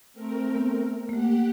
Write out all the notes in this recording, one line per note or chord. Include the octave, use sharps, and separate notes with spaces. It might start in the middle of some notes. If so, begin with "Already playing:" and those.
A3 C4 A#4
B3
A3 A#3 G4 F#5